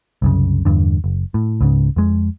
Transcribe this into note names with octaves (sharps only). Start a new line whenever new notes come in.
C2 F#2 C#3
E2 G2 D3
F#1
A2
C#2 G#2 C#3
F2 G#3